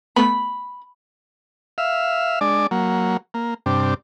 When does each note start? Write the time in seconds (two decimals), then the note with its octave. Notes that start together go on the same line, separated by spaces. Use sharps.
0.16 A3 B3 B5
1.78 E5 F5
2.41 G#3 D4 D5
2.71 F#3 A#3
3.34 A#3
3.66 G2 C3 D4